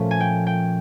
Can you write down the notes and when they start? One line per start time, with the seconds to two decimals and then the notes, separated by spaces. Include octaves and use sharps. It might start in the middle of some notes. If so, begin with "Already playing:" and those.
Already playing: A#2 F3 A3 C#4
0.11 G#5
0.20 G5
0.47 G5